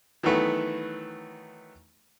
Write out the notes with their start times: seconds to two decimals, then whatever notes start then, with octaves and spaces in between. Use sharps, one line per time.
0.23 D#3 E3 F#3 A3 B3